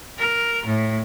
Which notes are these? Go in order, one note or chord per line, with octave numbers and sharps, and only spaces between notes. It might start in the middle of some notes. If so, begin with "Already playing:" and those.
A#4
A2